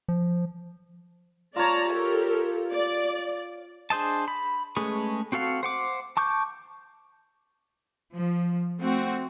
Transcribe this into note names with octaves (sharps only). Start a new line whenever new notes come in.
F3
F4 C#5 D5 A5 A#5
G4 A4 A#4
D5
D4 G#4 C5 D#5 A5
B5
G#3 A3 C#4 G#4 B4
C4 F#4 A4 F5 F#5
C5 F#5 D6
A5 C#6 D6 G6
F3
A3 C4 F#4